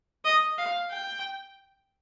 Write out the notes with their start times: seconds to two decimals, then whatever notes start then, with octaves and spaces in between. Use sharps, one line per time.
0.25 D#5
0.58 F5
0.91 G5